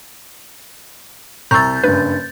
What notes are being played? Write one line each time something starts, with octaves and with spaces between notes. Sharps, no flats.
C2 A#5 C#6 E6 G6 A6
F#1 G2 B4